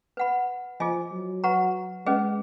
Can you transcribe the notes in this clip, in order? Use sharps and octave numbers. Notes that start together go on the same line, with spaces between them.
B4 F#5 B5
F3 F4 G#4 D#5 G#5
F#3
B4 F#5 A#5 C#6
G#3 C#4 G#4 B4 D#5